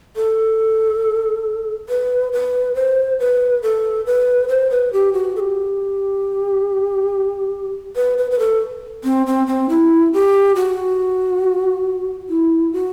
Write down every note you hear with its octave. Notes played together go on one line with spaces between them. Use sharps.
A4
B4
B4
C5
B4
A4
B4
C5
B4
G4
F#4
A4
G4
B4
B4
B4
A4
C4
C4
C4
E4
G4
F#4
E4
F#4